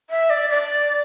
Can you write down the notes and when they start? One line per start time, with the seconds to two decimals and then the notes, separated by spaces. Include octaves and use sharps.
0.10 E5
0.30 D5
0.49 D5